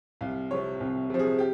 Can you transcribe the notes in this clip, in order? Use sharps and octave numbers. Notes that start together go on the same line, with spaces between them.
C2 F5
C3 F3 C#5
C2
C3 F3
G#4
G4